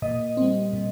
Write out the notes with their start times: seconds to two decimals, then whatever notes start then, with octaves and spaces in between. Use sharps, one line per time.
0.02 A#2 D#5
0.37 G3 C4
0.73 A#2